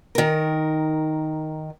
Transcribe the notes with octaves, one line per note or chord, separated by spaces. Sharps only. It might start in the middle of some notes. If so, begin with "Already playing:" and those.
D#3 A#4